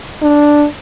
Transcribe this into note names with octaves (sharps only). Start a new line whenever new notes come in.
D4